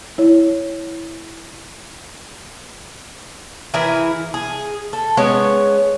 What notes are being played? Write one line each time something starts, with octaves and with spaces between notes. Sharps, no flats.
E4 C#5
E3 E4 G#4 A#4
G#4
A4
G#3 B3 C#4 C#5